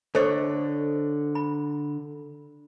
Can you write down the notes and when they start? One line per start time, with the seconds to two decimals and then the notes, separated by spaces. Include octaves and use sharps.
0.15 D3 A4 C5 C#5 D#5
1.35 B5